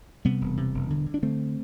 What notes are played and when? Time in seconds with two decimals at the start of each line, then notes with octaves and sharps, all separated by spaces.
0.25 C3 G3 B3
0.41 E1
0.57 C3
0.74 E1
0.90 D3
1.06 D3
1.14 D4
1.22 D3 A3 C4